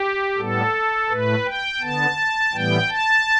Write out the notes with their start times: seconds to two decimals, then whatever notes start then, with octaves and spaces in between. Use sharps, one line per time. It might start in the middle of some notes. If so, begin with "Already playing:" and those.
Already playing: G4
0.37 A2 G3 B3 A4
1.09 A2 A3 B4
1.45 G5
1.81 D3 B3 A5
2.52 A2 E3 G3 B3 G5
2.89 A5